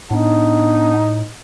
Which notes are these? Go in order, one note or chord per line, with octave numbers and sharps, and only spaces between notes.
A2 B3 D4 D#4